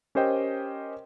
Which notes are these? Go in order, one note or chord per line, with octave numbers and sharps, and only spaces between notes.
C#4 G4 A#4 C5 D#5 G5